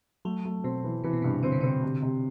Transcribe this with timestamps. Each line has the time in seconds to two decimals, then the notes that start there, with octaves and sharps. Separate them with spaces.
0.25 F#3 A3
0.45 A3
0.64 B2 C4
0.84 E3
1.04 C3 E3
1.13 B2
1.22 G2 C3
1.43 D3 C4
1.52 C3
1.61 D3 C4
1.83 C3
2.02 C3